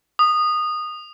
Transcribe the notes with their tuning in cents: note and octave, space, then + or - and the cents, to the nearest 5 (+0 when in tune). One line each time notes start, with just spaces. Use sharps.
D#6 -20